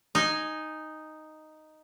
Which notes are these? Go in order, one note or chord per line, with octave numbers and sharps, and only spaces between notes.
D#4 G#5